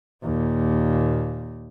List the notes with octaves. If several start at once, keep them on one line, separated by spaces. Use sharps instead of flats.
D#2 A#2